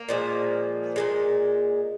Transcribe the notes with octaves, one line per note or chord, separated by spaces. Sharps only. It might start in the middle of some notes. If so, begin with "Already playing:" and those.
Already playing: A#3
A#2 F3 G#3
A#2 F3 G#3